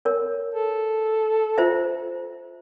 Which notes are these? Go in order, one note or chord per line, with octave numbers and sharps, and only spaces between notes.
A#4 C#5
A4
F4 C5 E5